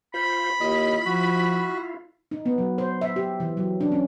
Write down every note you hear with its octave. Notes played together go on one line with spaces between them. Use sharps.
F4 C5 B5
D#2 E4 F4 D#5
F3 F#4
D#4
B3
F#3
C5
E5
G4
E3
F#3
D4
C#4